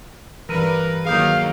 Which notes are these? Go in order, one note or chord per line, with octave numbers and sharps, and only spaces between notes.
G2 E3 A#4 B4 D#7
D#3 F#3 A#3 G#4 F5 D#6 G6